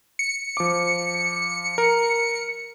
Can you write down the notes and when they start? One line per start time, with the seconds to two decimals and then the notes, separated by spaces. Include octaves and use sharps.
0.19 C#7
0.57 F3 D6
1.78 A#4